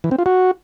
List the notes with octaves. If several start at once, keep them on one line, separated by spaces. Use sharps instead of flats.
E3
C4
F4
F#4